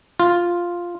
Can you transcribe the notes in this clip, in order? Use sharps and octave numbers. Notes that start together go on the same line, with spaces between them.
F4